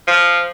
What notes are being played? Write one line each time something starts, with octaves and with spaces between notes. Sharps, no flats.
F3